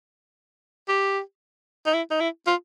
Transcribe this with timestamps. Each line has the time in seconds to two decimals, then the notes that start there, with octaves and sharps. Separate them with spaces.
0.88 G4
1.86 D#4
1.94 E4
2.11 D#4
2.20 E4
2.47 F4